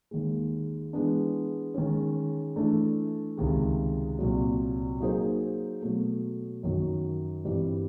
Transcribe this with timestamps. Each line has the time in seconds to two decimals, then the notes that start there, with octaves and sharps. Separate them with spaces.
0.11 D#2 D#3 G#3
0.93 E3 G#3 B3 D4
1.74 D#3 G#3 C#4
2.56 E3 A3 D4
3.37 C#2 C3 D#3 G#3
4.19 C2 A#2 F#3
5.01 F#3 A#3 D#4 G#4 C5
5.82 B2 F#3 A3
6.63 F#2 D#3 F#3
7.44 G2 E3 G3 C4